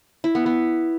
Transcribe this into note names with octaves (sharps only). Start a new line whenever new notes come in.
E4
B3
B3